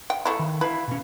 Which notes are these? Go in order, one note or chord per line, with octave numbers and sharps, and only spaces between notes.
G5
E3 A3 E4
D#3
E4 B4 E5 F5
B2 C#4